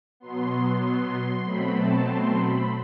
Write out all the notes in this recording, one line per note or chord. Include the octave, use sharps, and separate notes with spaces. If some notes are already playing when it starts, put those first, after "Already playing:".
B2 F#3 B3 C6
C6
B2 F#3 A3 C4 B5
A5
C6
B5